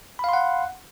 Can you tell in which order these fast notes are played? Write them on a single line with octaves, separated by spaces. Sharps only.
B5 F5 C6 F#5